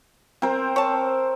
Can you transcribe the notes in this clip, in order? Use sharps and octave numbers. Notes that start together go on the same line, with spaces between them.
C4 A#4 C5
C#5 A5